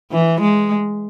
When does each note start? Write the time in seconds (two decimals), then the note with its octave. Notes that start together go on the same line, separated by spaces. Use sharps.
0.12 E3
0.41 G#3